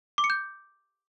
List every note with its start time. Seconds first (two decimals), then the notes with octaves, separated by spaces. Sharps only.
0.18 D6
0.24 C#7
0.30 G6